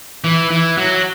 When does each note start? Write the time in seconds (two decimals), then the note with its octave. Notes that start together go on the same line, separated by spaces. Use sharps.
0.24 E3
0.51 E3
0.78 F#3